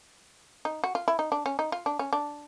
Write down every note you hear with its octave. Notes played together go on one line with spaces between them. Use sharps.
D#4
F#4
F4
E4
D#4
D4
C#4
D#4
F4
D4
C#4
D4